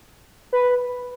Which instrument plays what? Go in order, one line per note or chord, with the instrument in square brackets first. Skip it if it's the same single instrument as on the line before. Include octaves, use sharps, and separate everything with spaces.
[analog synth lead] B4